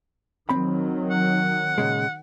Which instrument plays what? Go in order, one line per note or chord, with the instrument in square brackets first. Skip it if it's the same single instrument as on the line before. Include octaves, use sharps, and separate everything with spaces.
[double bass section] D#3 F#3 [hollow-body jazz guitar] C4 B5
[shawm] F#5
[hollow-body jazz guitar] A#2 C#3 G#3